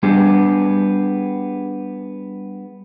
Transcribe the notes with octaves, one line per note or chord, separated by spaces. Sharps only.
G3 B3 D4 G4 G#4